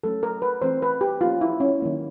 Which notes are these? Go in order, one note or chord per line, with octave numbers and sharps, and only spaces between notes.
F#3 A3 C#4 A4
A#4
B4
E3 A3 C4 C5
B4
G4
F3 A#3 C#4 F4
E4
C#4
D#3 F#3 A#3 C#4